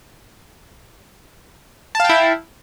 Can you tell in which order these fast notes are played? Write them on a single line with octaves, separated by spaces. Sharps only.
A5 F5 G5 E4